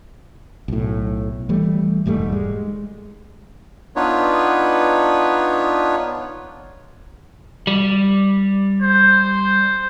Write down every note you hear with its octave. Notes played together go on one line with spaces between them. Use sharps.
B1 A2
E3 G3 A3
E1 G#2 G3 A3
G#3
B3 D4 D#4 F4 B4 C#5
G3
C5